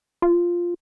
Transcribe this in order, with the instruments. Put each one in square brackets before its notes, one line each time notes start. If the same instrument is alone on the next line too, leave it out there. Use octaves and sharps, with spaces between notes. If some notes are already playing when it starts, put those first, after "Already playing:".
[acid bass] F4